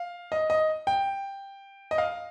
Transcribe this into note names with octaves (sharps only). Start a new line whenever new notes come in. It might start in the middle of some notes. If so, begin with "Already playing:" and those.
Already playing: F5
D#5
D#5
G5
D#5
F5